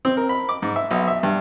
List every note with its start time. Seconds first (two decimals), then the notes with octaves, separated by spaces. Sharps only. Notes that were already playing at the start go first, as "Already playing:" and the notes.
0.05 C4
0.17 A#4
0.29 B5
0.49 D6
0.62 G#2
0.76 E5
0.91 B1
1.08 E5
1.23 G2